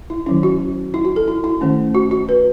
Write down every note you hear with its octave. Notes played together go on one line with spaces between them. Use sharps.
E4
D#3 F#3 C#4 E4
F#4
E4
F#4
A4
E4
E4
D#3 A3 C#4
F#4
F#4
B4